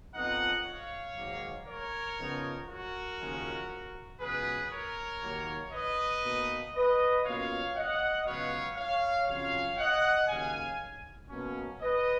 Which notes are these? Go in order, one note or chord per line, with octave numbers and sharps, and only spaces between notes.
F2 F3 B3 D#4 D#5 F#5
C#5 F5
G#2 D#3 F#3 A#3
A#4 C#5
C#3 F3 B3 D#4
F#4 A#4
D#2 C#3 F3 G#3 C#4
C#2 B2 F#3 B3 G#4 B4
A#4 C#5
D#2 D#3 F#3 A#3
B4 D#5
B2 A#3 D#4
B4 D#5
B2 A#3 C#4 F4 C#5 F5
D#5 F#5
C#2 B2 F#3 B3 C#5 F5
C#5 F5
F2 C#3 F#3 C#4 F4 C#5 F5
D#5 F#5
D#2 C#3 F#3 F5 G#5
B2 F#3 A#3 C#4
B4 D#5